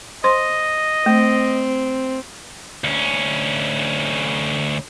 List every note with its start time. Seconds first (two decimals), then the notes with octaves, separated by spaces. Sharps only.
0.24 C5 D#5 C6
1.06 A3 C4
2.84 D2 C#4